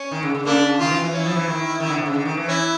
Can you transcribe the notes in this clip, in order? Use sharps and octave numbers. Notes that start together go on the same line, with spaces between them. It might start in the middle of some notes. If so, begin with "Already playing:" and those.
Already playing: C#4
D#3
C#3
C#3
C#3 A#3 D4
D#3 F4
E3
E3
C#4 E4
F3
E3
D#3
D#3
D3
C3
C#3
D3
D#3
E3
C#4 E4